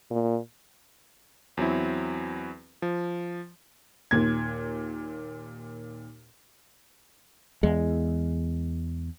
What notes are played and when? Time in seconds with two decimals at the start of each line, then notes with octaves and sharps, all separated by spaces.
0.11 A#2
1.57 E2 F#3 C4 E4
2.82 F3
4.11 D#2 A#2 G#6
7.63 E2 G#3